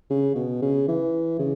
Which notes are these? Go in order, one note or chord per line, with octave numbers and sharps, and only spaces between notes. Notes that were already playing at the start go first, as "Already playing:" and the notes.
C#3
B2
C#3
E3
C#3